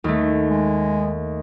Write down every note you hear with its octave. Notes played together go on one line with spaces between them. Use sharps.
D#2 A3
G#3